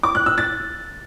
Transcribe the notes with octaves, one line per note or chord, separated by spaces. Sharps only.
D6
F#6
E6
A6